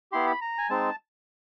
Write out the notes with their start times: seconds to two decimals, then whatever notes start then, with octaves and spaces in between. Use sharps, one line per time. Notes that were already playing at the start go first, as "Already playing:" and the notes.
0.12 B3 E4 G4 C6
0.27 B5
0.41 A#5
0.58 G#5
0.70 G#3 C4 D#4 A5